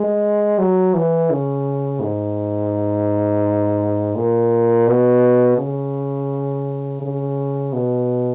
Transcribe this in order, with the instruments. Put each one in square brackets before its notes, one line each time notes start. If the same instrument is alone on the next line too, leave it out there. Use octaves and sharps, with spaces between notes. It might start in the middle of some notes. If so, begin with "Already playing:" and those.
Already playing: [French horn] G#3
F#3
E3
C#3
G#2
A#2
B2
C#3
C#3
B2